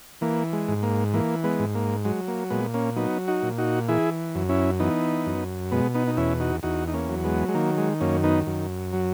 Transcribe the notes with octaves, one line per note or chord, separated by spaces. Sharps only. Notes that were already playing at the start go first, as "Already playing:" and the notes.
E3 A#3
G#3
G#2
A#3
E3 A#3
G#3 B3
G#2
A#3
F#3 G#3
A#3
A#2 G#3 B3
A#3 C#4
F#3 B3 D#4
D#4 F#4
A#2
D#4 F#4
E3 E4 G#4
F#2
C#4 E4
E3 B3 D#4
F#2
B2 G#3 B3
B3 D#4
D#4
E2 C#4 E4
D#4 F#4
E2 D#4 F#4
D#4
A#3 C#4
F#3
G#3 B3
G#3
D#3 A#3
G#3
F#2 A#3 C#4
B3 D#4
F#2
F#3